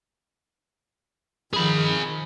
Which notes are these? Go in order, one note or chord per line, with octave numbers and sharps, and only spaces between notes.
D#3 F3 G#4 B5